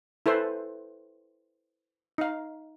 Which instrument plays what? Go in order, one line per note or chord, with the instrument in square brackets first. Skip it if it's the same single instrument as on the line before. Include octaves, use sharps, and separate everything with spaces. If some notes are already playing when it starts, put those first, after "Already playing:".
[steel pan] E4 A4 B4 C5
D#4 F5